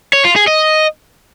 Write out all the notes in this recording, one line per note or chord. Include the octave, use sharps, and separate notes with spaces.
C#5
F4
G#4
D#5